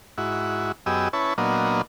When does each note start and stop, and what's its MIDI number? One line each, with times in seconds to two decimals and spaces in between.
0.18 0.72 44
0.18 0.72 64
0.18 0.72 66
0.86 1.08 42
0.86 1.08 59
0.86 1.08 67
0.86 1.08 68
0.86 1.08 75
0.86 1.08 88
1.13 1.34 61
1.13 1.34 64
1.13 1.34 71
1.13 1.34 73
1.13 1.34 81
1.38 1.82 46
1.38 1.82 54
1.38 1.82 58
1.38 1.82 59
1.38 1.82 62
1.38 1.82 75